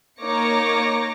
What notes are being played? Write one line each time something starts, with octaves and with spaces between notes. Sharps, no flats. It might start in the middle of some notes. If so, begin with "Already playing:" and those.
A#3 D#4 C#5 D6 A#6 C#7